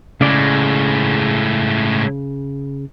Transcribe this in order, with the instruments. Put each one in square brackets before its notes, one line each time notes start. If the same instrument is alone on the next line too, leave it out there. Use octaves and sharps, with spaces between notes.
[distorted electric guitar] A2 G#3 [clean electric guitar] C#3 D5